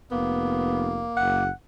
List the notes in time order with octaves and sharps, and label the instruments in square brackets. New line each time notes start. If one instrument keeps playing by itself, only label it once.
[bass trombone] F1 [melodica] A#3 [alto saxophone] B3
[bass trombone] F#1 [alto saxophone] F#5